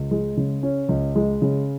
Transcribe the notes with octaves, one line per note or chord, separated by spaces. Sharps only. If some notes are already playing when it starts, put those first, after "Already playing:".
Already playing: C#2
G#3
C#3
C#4
C#2
G#3
C#3